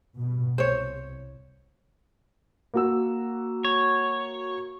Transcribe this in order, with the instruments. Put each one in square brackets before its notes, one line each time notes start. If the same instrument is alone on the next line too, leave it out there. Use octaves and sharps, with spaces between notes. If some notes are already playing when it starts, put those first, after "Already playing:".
[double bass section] G2 B2
[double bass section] C2 [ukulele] C5 C#5
[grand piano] A#3 F#4 E6
[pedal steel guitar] C#5